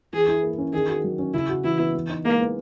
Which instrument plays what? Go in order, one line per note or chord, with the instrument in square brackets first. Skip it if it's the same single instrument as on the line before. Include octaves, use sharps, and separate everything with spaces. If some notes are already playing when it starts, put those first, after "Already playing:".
[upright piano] E3 [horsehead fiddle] G#4
[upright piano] E4
A#3
C#4
[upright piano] D#3 [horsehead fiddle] G#4
[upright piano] F#4
F#3
C#4
[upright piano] C#3 [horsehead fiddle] E4
[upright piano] F#4
[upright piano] E3 [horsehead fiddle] E4
[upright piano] B3
E3
D#4
[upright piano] G#3 [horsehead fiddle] A#3
[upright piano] B3